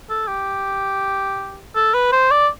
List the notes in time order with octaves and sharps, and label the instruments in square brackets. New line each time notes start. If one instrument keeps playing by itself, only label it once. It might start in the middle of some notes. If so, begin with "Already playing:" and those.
[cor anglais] A4
G4
A4
B4
C5
D5